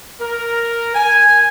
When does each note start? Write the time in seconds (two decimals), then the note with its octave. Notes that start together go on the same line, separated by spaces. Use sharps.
0.21 A#4
0.95 G#5